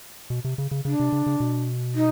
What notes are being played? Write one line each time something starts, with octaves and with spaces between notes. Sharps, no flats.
B2
C3
C#3
C#3
C#3 D4
C3
C#3
C#3
B2
D#4